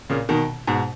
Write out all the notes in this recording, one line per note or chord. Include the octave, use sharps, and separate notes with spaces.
A#2 C#3
B2 D#3
G#2 B2